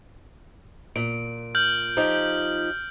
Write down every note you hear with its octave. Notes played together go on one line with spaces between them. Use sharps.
A#2 D7
F6 G6 F#7
F3 D#4 G4